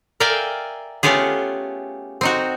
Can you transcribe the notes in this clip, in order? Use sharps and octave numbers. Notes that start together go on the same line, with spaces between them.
A#4 D5 E5 F5 G5 G#5
A3 B3 C#4 F4 G4 G#4
C4 D#4 F#4